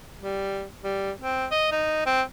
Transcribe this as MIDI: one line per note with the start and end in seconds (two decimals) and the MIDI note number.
0.21 0.65 55
0.83 1.11 55
1.20 1.46 60
1.51 1.70 75
1.72 2.06 63
2.06 2.22 60